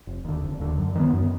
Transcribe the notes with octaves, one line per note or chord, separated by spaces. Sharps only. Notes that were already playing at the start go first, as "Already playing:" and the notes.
F1
D#2 D3
F1
D#2 D3
F#2
D#3 F#3 B3
F#2